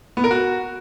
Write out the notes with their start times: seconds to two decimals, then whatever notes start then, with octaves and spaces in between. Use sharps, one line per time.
0.17 B3
0.24 A#4
0.31 F#4